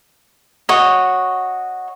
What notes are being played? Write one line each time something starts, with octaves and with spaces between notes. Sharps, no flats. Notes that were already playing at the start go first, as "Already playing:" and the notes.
F#4 C#5 D#5